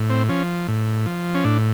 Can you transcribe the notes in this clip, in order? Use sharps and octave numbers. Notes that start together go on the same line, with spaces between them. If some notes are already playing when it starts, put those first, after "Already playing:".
Already playing: A2
C4
F3 C#4
A2
F3
C#4
A2 D4